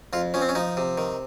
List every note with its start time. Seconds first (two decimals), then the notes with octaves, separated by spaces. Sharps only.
0.13 F2 F4
0.34 F3 C#4
0.41 C4
0.49 C#4
0.55 F3 D#4
0.77 C3
0.98 D#3